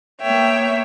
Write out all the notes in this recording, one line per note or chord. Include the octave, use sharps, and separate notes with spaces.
A#3 B3 C#5 E5 G5